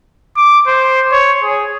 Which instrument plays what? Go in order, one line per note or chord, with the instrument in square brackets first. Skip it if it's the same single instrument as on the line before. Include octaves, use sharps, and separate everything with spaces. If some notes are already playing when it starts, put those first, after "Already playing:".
[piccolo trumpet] D6
C5
C#5
G#4